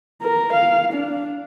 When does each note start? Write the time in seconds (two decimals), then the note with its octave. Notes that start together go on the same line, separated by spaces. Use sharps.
0.22 A#4
0.53 F5
0.93 D4